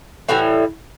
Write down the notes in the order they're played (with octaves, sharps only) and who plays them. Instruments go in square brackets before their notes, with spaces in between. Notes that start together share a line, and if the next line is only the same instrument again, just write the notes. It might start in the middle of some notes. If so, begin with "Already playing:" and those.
[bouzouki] A2 E3 G3 F#4